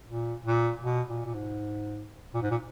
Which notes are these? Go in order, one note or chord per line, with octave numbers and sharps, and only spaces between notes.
A#2
A#2
B2
A#2
A#2
G#2
A#2
G#2
A#2